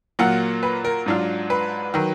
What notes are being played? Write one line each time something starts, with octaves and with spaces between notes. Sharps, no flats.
A#2 F#3 A#3 F4 F#5
B4
A#4
G#2 F#3 D4 F4
B4
D#3 F#3